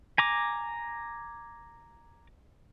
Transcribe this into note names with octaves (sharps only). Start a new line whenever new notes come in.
G#5 A#5 D6